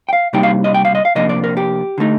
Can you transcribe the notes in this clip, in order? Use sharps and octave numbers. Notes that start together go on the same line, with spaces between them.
G5
F5
C3 G3 A#3 D#4 G5
F5
D#5
G5
F5
D#5
F5
C3 F3 A#3 D4 D#5
D5
A#4
G4
D3 A3 D#4